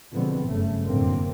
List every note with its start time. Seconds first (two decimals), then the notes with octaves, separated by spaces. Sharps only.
0.12 B2 D3 F3 G#3 B3 C4
0.46 F#1 G2 C#3 A3
0.85 F1 F#2 A2 D3 A#3 C4